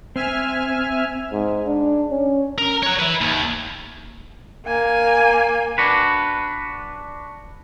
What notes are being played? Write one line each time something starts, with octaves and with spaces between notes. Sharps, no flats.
C4 E5 G#5 F6
G#2
D4
C#4
A#4
C#5 F#5
B4 E5
D#2
A#3 G#5
D4 F#4 B4